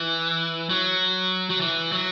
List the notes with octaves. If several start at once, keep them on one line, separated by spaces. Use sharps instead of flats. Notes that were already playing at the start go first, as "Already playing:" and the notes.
Already playing: E3
F#3
F#3
E3
F#3